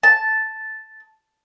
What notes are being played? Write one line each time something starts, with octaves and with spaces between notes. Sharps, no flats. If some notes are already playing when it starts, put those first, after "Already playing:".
A5